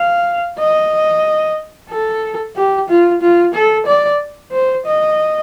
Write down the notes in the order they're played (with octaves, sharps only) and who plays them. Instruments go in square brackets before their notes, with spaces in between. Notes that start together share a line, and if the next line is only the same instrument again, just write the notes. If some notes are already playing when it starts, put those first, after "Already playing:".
Already playing: [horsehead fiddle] F5
D#5
A4
G4
F4
F4
A4
D5
C5
D#5